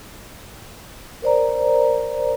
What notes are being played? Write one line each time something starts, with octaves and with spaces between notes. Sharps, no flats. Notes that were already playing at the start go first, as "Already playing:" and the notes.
A#4 C5 D5 A#5